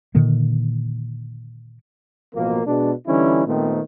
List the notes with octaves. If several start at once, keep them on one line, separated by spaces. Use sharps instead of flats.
A#2 D3 D#3 A#3
A1 B2 F3 A#3
B2 G#3 D4
D3 E3 G3 C#4 D#4 E4
A#2 D#3 A3 B3 C4